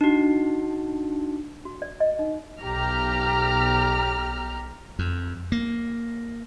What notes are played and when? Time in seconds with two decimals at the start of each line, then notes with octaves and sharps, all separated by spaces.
0.01 D4 D#4 F#4
1.65 F#4
1.82 D5
2.00 D#5
2.19 D#4
2.63 B1 G4 A#5 F6
4.99 F2
5.52 A#3